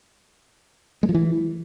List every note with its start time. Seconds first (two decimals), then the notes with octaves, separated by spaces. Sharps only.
1.03 G#3
1.09 F3
1.15 E3